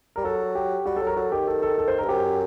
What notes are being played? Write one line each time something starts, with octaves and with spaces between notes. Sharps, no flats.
G3 A#4
F#3 A4
G4
G3 F#4
A4
F#3
A#4
F#3 A4
D#3 G4
A4
A4
A4
C5
A#4
G2
F#2 G4